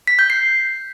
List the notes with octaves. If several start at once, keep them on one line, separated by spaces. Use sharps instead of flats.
B6
G6
C7